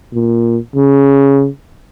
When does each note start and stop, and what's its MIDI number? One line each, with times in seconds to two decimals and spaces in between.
0.13 0.58 46
0.76 1.48 49